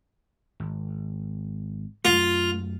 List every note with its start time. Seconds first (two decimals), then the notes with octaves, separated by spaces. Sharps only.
0.60 G#1
2.05 F#2 A3 F4